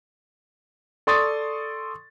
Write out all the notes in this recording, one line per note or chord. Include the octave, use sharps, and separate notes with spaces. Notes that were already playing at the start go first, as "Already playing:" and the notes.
A4 D5 C6 C#6 D#6 A6